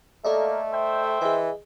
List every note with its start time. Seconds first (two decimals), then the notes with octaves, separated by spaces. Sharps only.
0.24 A3 A#3 A4 D5 D#5
0.72 C5 E5 G5
1.21 E3 G#4 D#5